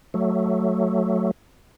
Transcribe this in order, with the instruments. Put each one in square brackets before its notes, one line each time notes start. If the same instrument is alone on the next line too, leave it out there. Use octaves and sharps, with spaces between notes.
[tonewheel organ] F#3 A3